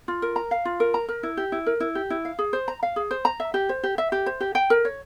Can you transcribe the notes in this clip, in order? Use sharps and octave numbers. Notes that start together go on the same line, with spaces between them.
F4
A#4
A#5
F5
F4
A#4
A#5
A#4
E4
G4
E4
A#4
E4
G4
E4
F5
G#4
C5
A#5
F5
G#4
C5
A#5
E5
G4
C5
G4
E5
G4
C5
G4
G5
A#4
C#5